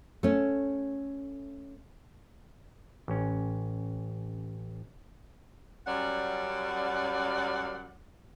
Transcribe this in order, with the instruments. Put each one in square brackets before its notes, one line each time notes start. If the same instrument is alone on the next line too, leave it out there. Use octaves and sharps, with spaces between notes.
[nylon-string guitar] A3 C#4
[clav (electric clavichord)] A1 C#4
[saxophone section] F#2 G3 C#4 D5 F#5